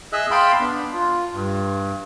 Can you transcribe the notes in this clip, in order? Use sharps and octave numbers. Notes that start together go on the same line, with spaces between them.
G#4 D#5 E5 E6 F#6
F5 G5 A5 B5 C6
B3 D4
F4
G2